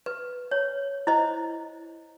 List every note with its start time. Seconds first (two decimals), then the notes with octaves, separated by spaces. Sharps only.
0.06 B4
0.51 C#5
1.07 E4 C5 D#5